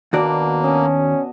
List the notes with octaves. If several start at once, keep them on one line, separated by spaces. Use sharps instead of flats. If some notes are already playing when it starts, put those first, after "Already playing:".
D#2 B2 A#3 D4 F#4 D5
C#4 D#5 A5 D6